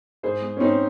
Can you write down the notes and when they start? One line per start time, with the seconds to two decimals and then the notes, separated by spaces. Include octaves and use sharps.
0.23 G#2 G#4 C5
0.42 G#3
0.57 C#4
0.60 G#2 C4 D#4